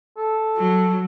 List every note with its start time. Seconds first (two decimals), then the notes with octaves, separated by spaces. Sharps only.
0.17 A4
0.57 F#3